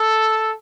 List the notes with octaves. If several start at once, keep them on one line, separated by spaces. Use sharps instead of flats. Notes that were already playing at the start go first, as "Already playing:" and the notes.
Already playing: A4